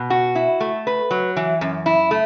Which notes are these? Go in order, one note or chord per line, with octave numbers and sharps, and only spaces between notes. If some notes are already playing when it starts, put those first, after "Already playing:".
Already playing: B2
F#4
E4
A3
B4
F#3
E3
F#2
E4
A3